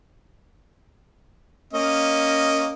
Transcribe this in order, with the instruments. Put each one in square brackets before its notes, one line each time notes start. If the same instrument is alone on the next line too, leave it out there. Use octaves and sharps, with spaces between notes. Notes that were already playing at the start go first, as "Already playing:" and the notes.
[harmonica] A#3 C#4 D#5